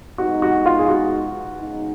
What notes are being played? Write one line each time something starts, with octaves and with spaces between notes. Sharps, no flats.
B2 G#3 B3 D#4 F#4
F#4
F4
G#4
F#4
C#3 G#3 B3 D#4